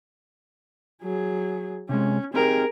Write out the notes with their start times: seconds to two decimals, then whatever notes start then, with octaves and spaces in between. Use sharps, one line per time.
1.03 F#3 G#4
1.89 C3 G#3 C#4
2.34 C4 D#4 G4 G#4 A#4